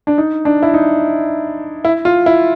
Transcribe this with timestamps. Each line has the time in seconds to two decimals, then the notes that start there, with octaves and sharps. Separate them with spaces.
0.07 D4
0.18 D#4
0.45 D4
0.63 E4
0.74 D#4
1.85 E4
2.05 F4
2.26 E4